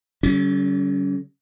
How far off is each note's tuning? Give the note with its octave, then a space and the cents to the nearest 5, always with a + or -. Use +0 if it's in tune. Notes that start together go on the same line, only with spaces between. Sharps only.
D3 -45 G3 -40 C#4 +15